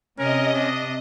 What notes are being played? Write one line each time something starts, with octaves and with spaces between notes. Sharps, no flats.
C3 C#4 A#4 D#5
D4